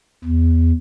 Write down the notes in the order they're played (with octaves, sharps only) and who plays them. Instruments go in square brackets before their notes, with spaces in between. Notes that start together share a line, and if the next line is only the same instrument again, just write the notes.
[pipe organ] E2